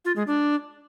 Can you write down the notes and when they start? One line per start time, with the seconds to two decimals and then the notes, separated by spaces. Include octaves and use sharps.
0.05 F4
0.16 G#3
0.27 D4